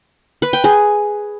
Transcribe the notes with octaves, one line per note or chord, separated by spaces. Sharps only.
B4
G5
G#4